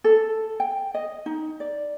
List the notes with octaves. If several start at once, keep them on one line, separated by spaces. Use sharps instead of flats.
A4
G5
D#5
D#4
D5